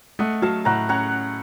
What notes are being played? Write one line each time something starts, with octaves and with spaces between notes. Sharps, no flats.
A3 D#5 F#5
F#3 F5 A5
A2 F#5 A#5
C#4 F#5 A#5